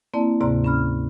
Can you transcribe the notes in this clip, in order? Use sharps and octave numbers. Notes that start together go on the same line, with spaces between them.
A#3 C4 E4 D5 A5
D2 G#2 C3 D5 A#5 C6
C#4 B5 F6